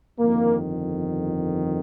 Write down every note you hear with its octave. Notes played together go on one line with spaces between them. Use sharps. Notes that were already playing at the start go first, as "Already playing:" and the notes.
G1 F2 D#3 A#3